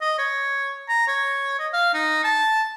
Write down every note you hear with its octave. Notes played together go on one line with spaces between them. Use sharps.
D#5
C#5
A#5
C#5
D#5
F5
D#4
A5